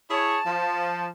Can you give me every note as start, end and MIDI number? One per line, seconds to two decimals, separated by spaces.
0.11 0.38 64
0.11 0.38 68
0.11 0.38 73
0.11 1.09 81
0.46 1.07 53